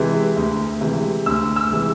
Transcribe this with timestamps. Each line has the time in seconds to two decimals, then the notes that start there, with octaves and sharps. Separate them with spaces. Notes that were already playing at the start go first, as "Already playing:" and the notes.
Already playing: C3 E3 G#3
0.36 D2
0.81 C3 E3 G#3
1.26 D2 E6
1.56 E6
1.72 C3 E3 G#3